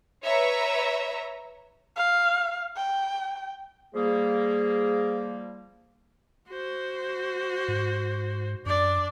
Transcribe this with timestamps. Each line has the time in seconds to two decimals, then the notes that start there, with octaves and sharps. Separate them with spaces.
0.24 B4 C#5 E5 A#5
1.97 F5
2.76 G5
3.94 F3 G3 A#3 G#4
6.49 F#4 C5
7.68 G#2
8.66 F#2 D4 D5